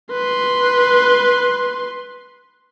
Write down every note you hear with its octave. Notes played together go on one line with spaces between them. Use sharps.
B4 C6